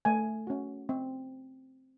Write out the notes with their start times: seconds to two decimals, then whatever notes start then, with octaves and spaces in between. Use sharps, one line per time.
0.05 A3 G#5
0.47 C#4 F#4
0.89 C4